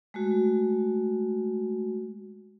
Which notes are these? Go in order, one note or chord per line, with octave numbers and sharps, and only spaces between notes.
G#3 A3 F#4